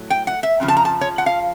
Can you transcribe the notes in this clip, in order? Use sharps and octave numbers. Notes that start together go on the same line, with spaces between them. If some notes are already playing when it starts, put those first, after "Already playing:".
Already playing: A2 F#3
G5
F#5
E5
F2 C#3 F3
A5
A#5
A5
C#5
F#5
F5